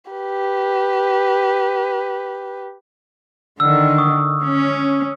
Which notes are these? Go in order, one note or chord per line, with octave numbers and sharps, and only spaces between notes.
G4 B4
D3 D#3 E6 F6
C#6 D#6
C#4